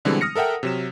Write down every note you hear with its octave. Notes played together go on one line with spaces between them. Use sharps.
B2 D3 E3 G3 G#3 C4
D#6 F6 A#6 C#7
A4 A#4 E5 F#5 G5
C3 F#3 E7